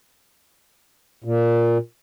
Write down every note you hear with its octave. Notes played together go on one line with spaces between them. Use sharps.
A#2